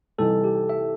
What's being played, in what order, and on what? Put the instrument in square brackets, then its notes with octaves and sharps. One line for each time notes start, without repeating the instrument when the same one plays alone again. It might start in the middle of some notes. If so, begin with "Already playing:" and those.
[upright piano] C2 C3 E3 G3 D#4 [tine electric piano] A4
[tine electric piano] G4
E5